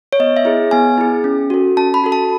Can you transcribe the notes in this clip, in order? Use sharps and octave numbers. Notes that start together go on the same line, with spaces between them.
C#5
B3 D#5
E5
E4 G#4
B3 G#5
E4 G#4
C#4
F#4 A4
C#4 A5
B5
F#4 A4
A5